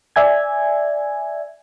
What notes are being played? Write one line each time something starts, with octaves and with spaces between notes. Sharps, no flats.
D5 E5 G#5 G#6